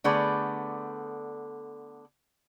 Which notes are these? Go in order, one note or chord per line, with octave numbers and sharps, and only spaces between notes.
D3 A3 B3 G#4 D5